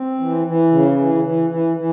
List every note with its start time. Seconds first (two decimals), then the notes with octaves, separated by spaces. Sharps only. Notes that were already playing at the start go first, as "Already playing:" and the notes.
Already playing: C4
0.20 E3
0.46 E3
0.72 C#3
0.98 E3
1.24 E3
1.50 E3
1.77 E3